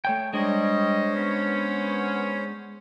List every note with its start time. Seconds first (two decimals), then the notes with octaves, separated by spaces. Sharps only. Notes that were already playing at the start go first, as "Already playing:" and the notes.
0.05 A3 C#5 G5
0.33 G3 G#3 D4 C5 C#5 D#5
1.15 B3 C#4